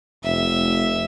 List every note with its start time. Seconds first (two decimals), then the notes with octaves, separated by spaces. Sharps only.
0.24 F1 E5